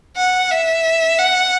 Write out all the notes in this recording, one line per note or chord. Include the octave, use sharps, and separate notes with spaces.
F#5
E5
F#5